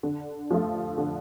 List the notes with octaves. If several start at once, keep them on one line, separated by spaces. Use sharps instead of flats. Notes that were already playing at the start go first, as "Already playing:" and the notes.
D3
F3 A3 F4
D3